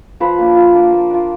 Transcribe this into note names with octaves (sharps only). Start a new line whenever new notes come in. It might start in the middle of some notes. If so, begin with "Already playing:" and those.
F3 B4
A#3 D4
F3
A#3 D4
A#3
D4 F4